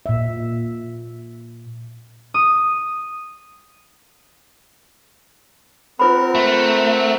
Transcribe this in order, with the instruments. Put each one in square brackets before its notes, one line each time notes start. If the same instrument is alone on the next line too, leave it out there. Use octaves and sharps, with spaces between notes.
[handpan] A#2 E5
[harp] D#6
[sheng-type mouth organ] C4 A#4 F#5 [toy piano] F4 B4 B5
[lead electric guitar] A3